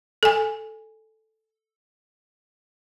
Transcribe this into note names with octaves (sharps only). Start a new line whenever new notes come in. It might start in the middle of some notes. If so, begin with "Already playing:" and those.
A4 G#5